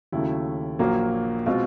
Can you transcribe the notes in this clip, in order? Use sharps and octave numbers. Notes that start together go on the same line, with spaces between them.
D#2 C#3 F#3 A3 E4
A#1 A#2 F#3 A#3
B2 G#3 C4 F4